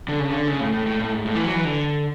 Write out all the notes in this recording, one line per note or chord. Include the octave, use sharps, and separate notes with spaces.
D3
C#3
D3
C#3
A2
A2
A2
A2
G#2
A2
E3
F#3
E3
D3